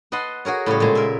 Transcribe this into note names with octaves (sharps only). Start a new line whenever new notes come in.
B4 D#5 F#5 A5 C6
F#4 G#4 A#4 C#5
A2 C#3 G3 C#5
A#2 G#3
A#4 E5